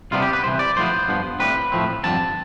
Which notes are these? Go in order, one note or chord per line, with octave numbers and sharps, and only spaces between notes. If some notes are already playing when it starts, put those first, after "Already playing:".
C2 C3 G3 B3 D4 F4
G4
B4
C2 C3 E3 C5
D5
B1 A2 F3 B3 C5
G2 F3 B3
A2 G3 C4 B4
A2 F3 A3 C4
G2 D3 F3 C4 A5